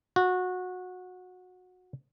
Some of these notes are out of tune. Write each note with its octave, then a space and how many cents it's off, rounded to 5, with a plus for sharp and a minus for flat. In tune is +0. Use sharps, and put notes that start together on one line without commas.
F#4 -20